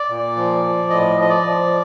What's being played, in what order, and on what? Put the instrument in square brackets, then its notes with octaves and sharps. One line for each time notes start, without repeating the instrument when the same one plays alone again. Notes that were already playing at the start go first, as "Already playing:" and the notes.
Already playing: [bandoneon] D5
A#2
F3
F3
A2 D#5
F3 D#5
D5
F3